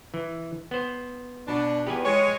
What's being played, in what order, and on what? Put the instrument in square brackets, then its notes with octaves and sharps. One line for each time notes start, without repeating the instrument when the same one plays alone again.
[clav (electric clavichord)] E3
B3 C5
[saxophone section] B2 D4
[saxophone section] E2 [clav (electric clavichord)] G4 B4 G#5
[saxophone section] G#3 C#5